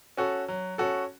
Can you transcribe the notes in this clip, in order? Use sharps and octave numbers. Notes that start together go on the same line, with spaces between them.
C#4 F#4 A4
F#3
C#4 F#4 A4